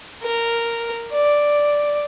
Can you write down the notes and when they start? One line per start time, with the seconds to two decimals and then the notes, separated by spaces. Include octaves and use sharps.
0.23 A#4
1.12 D5